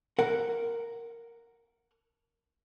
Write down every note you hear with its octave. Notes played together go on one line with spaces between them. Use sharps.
A#4 F#5